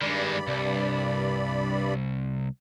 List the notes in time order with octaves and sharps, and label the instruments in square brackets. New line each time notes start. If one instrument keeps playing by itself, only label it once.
[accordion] G2 D5 B5 [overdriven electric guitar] D#3 G#3
[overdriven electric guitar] C2